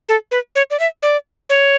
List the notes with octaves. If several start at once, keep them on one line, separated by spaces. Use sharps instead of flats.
A4
B4
C#5
D5
E5
D5
C#5